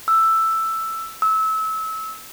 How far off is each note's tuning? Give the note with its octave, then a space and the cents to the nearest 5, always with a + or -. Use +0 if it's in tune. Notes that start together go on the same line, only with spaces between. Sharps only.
E6 +5
E6 -25